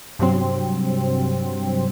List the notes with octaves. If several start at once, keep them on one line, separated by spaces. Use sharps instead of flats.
G2 C3 F#3 C4